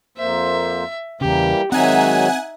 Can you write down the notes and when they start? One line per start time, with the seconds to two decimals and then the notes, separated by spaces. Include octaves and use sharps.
0.18 F2 A#3 C5 E5
1.21 E2 C#3 E3 G3 A#3 G4
1.72 G#2 D#3 F#3 C4 D#4 E5 F#5 G#5